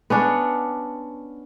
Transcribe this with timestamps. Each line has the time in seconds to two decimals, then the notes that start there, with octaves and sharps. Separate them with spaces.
0.10 B3 C#4 D4